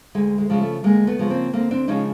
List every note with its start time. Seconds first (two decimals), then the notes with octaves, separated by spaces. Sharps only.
0.15 D2 G#3
0.38 G#3
0.50 C#3 F3 G#3
0.61 A3
0.84 D2 G#3 A#3
1.07 A3 B3
1.19 C#3 F3 G#3
1.30 A#3 C4
1.53 D2 A#3 C4
1.71 C4 D4
1.88 C#3 F3 G#3 C#4 D#4